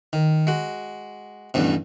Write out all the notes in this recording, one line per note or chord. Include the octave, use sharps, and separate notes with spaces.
D#3
G#3 F#4
A1 E2 G2 B2